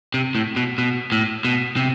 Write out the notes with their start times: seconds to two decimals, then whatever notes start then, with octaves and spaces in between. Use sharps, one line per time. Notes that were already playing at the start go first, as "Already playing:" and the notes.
0.14 C3
0.35 A2
0.56 B2
0.78 B2
1.12 A2
1.45 B2
1.77 C3